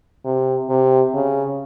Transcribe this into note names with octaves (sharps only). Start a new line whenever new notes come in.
C3
C3
C#3